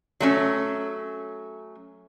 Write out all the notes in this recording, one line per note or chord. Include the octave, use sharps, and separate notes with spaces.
F#3 A3 C#4